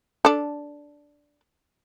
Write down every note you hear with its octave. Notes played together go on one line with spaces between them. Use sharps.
D4 A4